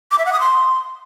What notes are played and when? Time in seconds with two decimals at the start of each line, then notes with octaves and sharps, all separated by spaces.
0.11 D6
0.18 E5
0.25 F#5
0.33 D#6
0.40 C6